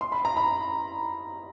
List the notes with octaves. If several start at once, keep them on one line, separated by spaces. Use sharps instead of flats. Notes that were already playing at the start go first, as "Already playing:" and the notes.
C6
B5
A#5
B5